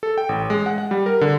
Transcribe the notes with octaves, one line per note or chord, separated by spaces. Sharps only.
A4
G5
A1
G#3
F#5
F#5
G3
A#4
D3